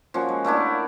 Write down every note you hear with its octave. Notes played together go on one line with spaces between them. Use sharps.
F3 A#3 C#4 F#4
G#3
A3 A#3 D4 E4